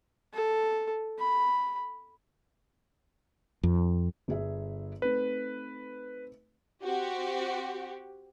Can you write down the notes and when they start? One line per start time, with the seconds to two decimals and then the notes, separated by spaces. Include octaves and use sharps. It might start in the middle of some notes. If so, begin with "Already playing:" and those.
0.34 A4
1.19 B5
3.63 F2
4.28 G1 G#4 E5
5.02 A3 C4 D#4 B4
6.83 C4 F#4 G4